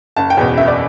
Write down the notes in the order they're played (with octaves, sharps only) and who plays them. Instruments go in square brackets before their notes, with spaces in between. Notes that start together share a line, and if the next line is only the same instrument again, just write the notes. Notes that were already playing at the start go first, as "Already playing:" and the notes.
[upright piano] F#1 A5
G5
E2 B2
F#1 E5
D5